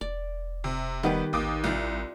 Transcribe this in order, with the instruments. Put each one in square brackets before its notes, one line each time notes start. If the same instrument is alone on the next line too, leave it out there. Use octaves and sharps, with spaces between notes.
[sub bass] E1 [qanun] D5
[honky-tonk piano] C3
[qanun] D#3 G4 B4 [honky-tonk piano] G3 B3
[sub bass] A1 [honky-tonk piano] D#2 D6 D#6
[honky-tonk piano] C2 [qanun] F4 C5 D5